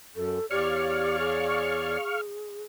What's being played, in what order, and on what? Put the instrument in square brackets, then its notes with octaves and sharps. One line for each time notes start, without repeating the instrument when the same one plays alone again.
[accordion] F#2 [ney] A4
[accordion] E2 C#5 D5 [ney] G4 [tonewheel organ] F5 C#6 F6
[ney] G#4